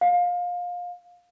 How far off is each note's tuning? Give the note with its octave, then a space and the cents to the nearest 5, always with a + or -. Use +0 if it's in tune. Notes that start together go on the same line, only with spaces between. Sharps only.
F5 +25